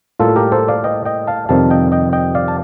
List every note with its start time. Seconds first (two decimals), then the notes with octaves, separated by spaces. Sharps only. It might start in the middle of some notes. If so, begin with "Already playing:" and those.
0.19 A2 G3 A#3 F4 A4
0.36 G4 A#4
0.52 A4 C5
0.68 D5 F5
0.84 D#5 G5
1.05 D#5 G5
1.27 F5 A5
1.49 F2 C3 D#3 G3 F5 A5
1.71 D#5 G5
1.92 D#5 G5
2.13 D#5 G5
2.35 D5 F5
2.48 A5